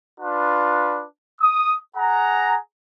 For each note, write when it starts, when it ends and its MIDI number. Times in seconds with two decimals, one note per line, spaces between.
0.20 1.04 62
0.20 1.04 65
0.20 1.04 71
1.40 1.77 87
1.97 2.57 68
1.97 2.57 78
1.97 2.57 82